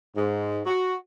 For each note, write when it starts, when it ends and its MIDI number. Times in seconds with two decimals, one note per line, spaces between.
0.15 0.60 44
0.66 0.96 66